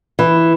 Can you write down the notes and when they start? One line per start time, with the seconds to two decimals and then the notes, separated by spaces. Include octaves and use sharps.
0.19 E3